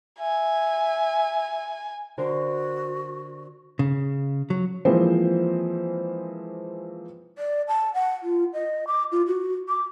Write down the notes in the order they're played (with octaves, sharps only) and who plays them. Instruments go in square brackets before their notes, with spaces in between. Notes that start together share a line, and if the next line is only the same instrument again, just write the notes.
[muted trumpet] E5 [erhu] G#5
[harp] D3 A#4 C5 [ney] F#4
[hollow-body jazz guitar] C#3
F#3
[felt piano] E3 F3 G#3 A#3 C4 C5
[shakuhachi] D5
A5
F#5
F4
D#5
D6
F4
F#4
D6